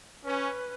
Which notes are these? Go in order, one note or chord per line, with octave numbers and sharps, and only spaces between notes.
C#4 B4